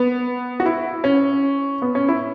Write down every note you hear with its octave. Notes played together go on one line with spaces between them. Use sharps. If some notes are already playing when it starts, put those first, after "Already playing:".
Already playing: B3
F#4
E4
C#4
B3
C#4
E4